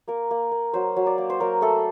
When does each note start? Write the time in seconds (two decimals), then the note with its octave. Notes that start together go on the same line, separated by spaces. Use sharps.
0.08 A#3 A#4
0.31 A#3
0.52 A#3
0.74 F#3 C5
0.96 F#3
1.06 D5
1.18 A#3
1.30 C5
1.40 F#3 A#4
1.61 A3 A4